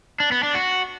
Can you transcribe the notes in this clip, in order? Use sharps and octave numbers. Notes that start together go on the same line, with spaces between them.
D4
B3
D4
F#4